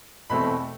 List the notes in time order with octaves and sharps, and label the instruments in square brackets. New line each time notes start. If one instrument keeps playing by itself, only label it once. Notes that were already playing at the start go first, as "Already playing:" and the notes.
[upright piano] E2 B2 A3 C4 B5